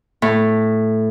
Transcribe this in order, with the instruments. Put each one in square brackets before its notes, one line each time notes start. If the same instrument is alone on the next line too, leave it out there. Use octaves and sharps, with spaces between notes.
[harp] A2